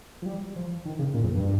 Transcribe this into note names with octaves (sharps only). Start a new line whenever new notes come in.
F3
G3
F3
D#3
C#3
A#2
F2
G2